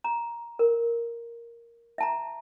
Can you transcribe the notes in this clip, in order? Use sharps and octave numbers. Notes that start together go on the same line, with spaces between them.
A#5
A#4
E5 A5 A#5